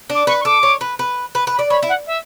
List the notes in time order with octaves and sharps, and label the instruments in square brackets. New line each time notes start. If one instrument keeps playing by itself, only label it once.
[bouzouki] D4 [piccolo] D6
[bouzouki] B4 [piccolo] C#6
[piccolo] C#6
[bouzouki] A4 [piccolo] D6
[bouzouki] C#5
B4
B4
B4
B4
[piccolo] B5
[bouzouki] D5
[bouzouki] C#5 [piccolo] B5
[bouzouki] E4
[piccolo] F#5
E5